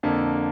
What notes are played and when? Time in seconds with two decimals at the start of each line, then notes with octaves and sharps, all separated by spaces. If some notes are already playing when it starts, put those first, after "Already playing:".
0.03 F2 D3 A#3